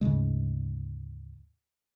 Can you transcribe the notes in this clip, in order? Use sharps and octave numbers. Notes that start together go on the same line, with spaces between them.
D2 G#2 C#3 G#3